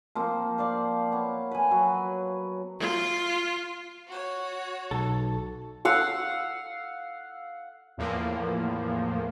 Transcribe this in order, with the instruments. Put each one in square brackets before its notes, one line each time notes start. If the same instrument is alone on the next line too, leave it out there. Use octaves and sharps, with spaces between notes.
[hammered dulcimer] F3 A#3 C4
C5 D5 F5
B3 C#5
B4 G#5
F#3
[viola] F4
[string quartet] F#4 C#5
[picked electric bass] B1 [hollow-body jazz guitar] A4
[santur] F5 F#5 E6
[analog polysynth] E2 A2 F3 A#3